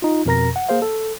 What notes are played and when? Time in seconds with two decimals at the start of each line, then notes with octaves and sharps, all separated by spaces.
0.02 D#4 F4
0.26 F2 B2 A#4 A#5 A#6
0.56 F#5
0.69 A#3 G#4 C5 F5
0.82 A4